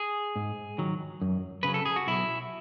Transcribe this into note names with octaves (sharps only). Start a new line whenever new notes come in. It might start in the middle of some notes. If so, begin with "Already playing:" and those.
Already playing: G#4
G#2
D#3 F#3
F#2
C#3 F#3 B4
A4
G#4
F#4
B1 E4